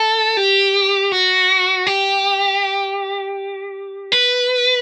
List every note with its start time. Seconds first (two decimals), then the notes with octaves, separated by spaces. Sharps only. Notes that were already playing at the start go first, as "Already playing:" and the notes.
Already playing: A4
0.37 G4
1.12 F#4
1.87 G4
4.12 B4